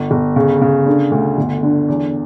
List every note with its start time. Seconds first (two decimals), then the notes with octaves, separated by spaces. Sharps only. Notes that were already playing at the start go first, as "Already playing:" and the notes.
Already playing: G1
0.11 G1
0.36 C#3
0.61 C#3
0.86 D3
1.11 D2
1.38 G1
1.63 D3
1.88 E2